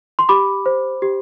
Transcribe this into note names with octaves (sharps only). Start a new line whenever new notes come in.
C6
G4 B5 D6
C5
G4